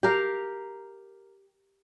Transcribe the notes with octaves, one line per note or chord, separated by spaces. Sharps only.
G4 A#4 F5